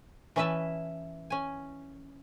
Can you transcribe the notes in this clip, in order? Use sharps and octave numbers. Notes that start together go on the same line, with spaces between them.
E3 C#4 E4 B4 E5 A5
C#4 G#5